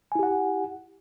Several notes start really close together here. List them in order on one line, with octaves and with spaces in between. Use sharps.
G#5 E4 G4 F#5